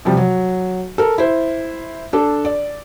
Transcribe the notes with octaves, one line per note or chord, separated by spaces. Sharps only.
C3 F3 G3
F#3
A4 A#4
E4 C5
D4 A4
D5